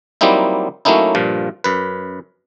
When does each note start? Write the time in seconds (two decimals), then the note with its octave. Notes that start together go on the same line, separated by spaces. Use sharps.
0.21 F#3 G3 A#3 C4 D#4 E4
0.85 F#3 A3 A#3 C#4 D#4 E4
1.15 G2 A#2 F3
1.64 F#2 B4